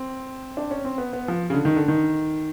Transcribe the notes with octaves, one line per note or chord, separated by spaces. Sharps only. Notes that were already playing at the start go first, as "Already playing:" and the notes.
Already playing: C4
D4
C#4
C4
B3
B3
F3
C#3
D3
D#3
D3
D#3